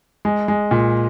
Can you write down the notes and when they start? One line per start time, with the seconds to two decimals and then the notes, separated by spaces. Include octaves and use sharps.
0.25 G#3
0.48 G#3
0.71 A#2